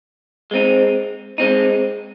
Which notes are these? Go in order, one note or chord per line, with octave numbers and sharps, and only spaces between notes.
G#3 C4 D#4
G#3 C4 D#4